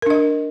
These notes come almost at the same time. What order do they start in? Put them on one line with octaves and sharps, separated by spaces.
A#4 D4 D#5